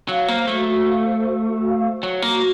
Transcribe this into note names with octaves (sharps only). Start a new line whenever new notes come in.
F#3 F5
A#3 C5
A3 F#4
F#4
F5
C5
F#4
F#4
F5
C5
F#3 F#4
A#3 F#4